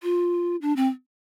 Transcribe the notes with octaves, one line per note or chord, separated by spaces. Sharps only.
F4
D4
C4